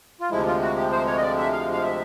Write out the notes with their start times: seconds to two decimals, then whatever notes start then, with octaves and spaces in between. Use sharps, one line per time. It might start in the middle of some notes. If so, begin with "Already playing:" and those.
0.21 F4
0.31 D2 C3 F3 G#3 E4
0.46 F4
0.62 F#4
0.76 G4
0.92 C5
1.07 C#5
1.17 D#5
1.22 D5
1.38 E5
1.52 F5
1.72 F5
1.83 E5